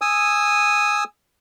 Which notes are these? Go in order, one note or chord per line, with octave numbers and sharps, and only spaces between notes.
G#5 D#6 E6